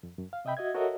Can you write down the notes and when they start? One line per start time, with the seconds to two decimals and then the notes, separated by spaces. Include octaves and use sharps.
0.03 F2
0.18 F#2
0.33 F5
0.45 C3 D#5 E5 G5 B5
0.57 F#4 D#5 E5 G#6
0.74 F#4 A4 A#4 C#5 D#5 E5